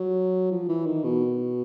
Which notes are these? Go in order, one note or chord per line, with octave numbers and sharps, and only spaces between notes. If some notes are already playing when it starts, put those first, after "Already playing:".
Already playing: F#3
F3
E3
D#3
B2